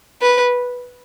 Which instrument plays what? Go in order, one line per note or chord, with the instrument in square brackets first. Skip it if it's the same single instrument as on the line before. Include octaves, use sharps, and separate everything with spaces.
[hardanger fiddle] B4